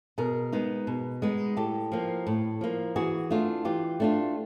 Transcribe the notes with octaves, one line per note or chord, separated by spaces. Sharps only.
B2 G#4 A#4
G#3 B3 D#4
B2
G#3 B3 D#4
A2 G4 A4
F3 A#3
A2
F3 A#3
E3 F#4 G#4
A3 D4 F4
E3 F4 G4
A3 D4 F4